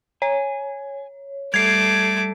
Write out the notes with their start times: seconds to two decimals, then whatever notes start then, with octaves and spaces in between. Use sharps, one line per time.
0.22 C#5 G#5
1.54 G3 A3 D6 G#6 C7